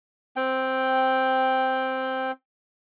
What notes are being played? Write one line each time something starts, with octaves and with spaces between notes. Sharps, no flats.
C4 G5